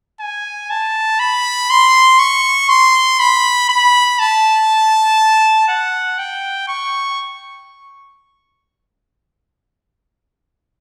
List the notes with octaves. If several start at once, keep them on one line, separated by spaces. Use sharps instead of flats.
G#5
A5
B5
C6
C#6
C6
B5
B5
A5
F#5
G5
C#6